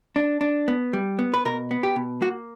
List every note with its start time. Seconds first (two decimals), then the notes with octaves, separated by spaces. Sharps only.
0.16 D4
0.41 D4
0.68 B3
0.93 G3
1.19 B3
1.34 B4
1.45 B2 A#4
1.71 B3
1.83 G4
1.96 B2
2.22 A#3 F#4